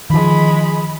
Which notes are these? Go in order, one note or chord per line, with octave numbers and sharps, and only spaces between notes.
D#3 F3 G#3 B5